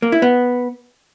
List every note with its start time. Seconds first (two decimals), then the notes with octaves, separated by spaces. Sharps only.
0.02 A#3
0.12 E4
0.22 B3